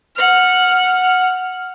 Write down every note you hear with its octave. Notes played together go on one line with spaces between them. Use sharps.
F#5 F6